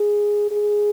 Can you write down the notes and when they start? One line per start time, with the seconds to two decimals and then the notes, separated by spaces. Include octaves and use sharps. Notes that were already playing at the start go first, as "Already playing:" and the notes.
Already playing: G#4
0.51 G#4